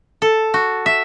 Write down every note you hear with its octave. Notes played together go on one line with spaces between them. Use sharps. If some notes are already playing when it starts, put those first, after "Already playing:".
A4
F#4
E5